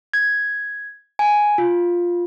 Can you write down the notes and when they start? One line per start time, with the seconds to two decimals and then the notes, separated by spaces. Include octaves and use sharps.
0.14 G#6
1.19 G#5
1.58 F4